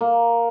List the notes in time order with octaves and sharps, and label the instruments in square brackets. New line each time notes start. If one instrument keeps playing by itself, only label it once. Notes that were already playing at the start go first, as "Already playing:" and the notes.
[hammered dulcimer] A#3